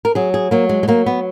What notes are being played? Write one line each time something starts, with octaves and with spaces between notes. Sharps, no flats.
A#4
F#3 G#4
G#4
F#3 A#3
G#3
G#3
F#3 A#3
B3